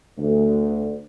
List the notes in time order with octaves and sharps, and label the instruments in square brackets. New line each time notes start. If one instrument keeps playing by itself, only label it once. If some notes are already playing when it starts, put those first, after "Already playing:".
[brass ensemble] D2